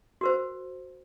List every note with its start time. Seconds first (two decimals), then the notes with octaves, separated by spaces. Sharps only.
0.21 F#4 A#4 C5